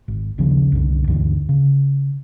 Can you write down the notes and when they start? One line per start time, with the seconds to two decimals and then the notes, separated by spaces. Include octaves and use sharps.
0.08 G#1
0.38 A#1 D#2 C#3 F3
0.72 C2 F#2 D3
1.08 D2 G2 D3 E3
1.49 C#3